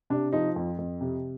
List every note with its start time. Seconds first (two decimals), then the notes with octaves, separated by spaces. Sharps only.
0.10 C3 D4
0.32 F3 D#4
0.56 F2
0.78 F2
1.01 C3